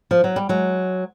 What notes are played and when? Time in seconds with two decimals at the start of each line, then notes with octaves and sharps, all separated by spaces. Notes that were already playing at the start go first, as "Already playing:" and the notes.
0.11 F3
0.24 F#3
0.36 G3
0.49 F#3 G#3